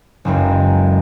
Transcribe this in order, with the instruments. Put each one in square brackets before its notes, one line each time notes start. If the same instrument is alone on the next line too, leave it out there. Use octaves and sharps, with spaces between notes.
[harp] F#1 C#2 F#2